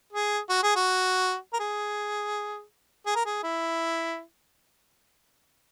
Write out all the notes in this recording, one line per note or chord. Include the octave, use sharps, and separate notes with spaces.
G#4
F#4
G#4
F#4
A#4
G#4
G#4
A#4
G#4
E4